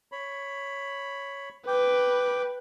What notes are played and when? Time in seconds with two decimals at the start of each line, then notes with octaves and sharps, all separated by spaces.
0.12 C#5 B5
1.67 B4 G5 D6